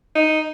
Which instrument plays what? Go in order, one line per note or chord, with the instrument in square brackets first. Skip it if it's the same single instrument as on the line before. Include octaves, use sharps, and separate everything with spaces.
[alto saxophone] D#4